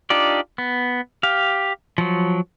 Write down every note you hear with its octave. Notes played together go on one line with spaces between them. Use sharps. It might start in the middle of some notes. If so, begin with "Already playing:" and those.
D4 D#4 F4 G4 D5
B3
G4 F5
F3 F#3